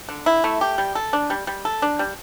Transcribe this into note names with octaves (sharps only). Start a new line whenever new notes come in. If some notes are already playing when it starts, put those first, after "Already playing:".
D3
E4
A3
G4
G3
A4
D4
G3
G3
A4
D4
G3